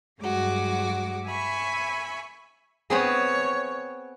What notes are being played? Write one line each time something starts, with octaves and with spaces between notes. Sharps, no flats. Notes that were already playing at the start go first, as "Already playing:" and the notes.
G2 F#3 G#3 F#4 D6
E5 G#5 B5 C#6
B3 C4 G#4 C#5